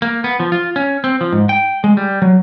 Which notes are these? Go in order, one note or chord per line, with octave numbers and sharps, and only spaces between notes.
A#3
B3
F3
F4
C#4
C4
F3
G#2
G5
G#3
G3
F#3